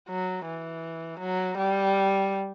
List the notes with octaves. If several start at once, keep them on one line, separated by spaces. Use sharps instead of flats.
F#3
E3
F#3
G3